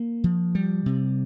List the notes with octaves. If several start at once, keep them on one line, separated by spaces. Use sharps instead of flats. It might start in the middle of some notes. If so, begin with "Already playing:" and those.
Already playing: A#3
F3
G3
C3